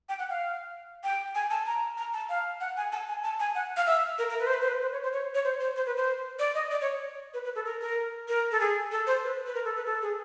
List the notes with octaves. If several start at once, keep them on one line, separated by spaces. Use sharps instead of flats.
G5
F#5
F5
G5
G#5
A5
A#5
A#5
A5
F5
F#5
G#5
A5
G#5
A5
G#5
F#5
F5
E5
A#4
A#4
B4
C5
B4
C5
B4
C5
C#5
C5
C#5
C#5
C5
C5
C5
B4
C5
D5
D#5
D5
C#5
B4
B4
A4
A#4
A#4
A#4
A4
G#4
A4
C5
B4
B4
A#4
A4
B4
A4
G#4